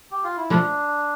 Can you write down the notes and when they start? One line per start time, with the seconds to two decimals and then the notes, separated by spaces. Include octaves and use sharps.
0.12 G4
0.24 F4
0.37 E4
0.50 F3 A3 D4